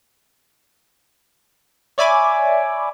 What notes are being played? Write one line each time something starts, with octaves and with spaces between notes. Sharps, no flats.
C#5 D5 E5 G#5 B5 D6